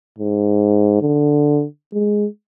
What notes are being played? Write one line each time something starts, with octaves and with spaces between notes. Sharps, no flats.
G#2
D3
G#3